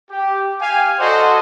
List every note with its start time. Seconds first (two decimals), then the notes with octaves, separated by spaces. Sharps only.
0.11 G4
0.61 G4 F5 G#5
0.99 F#4 A4 C5 D5 D#5 F#5